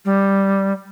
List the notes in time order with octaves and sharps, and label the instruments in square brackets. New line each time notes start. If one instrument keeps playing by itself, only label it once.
[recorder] G3